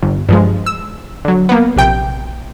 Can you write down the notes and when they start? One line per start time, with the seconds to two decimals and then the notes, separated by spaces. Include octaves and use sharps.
0.03 G1
0.29 G2 F3 G#3
0.66 E6
1.25 D3 F#3
1.49 A#3 B3
1.76 A#1 C3 G5